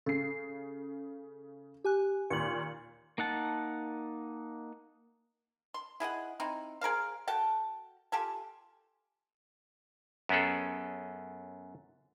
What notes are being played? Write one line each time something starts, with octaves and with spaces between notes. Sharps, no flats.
C#3 A4 C7
G4 G#5 F#6
D#2 A#2 C#7 F#7
A#3 D#4 F#5 A5
C6
E4 G#4 D#5 F#5
C4 D#4 E4
G#4 A#4 C5 F5
F#4 A4 G5 A5
F4 G4 A4 G#5
F#2 B3 C#4 G#4 A4